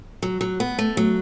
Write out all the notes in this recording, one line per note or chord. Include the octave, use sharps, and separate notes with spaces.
F#3
F#3
B3
A3
F#3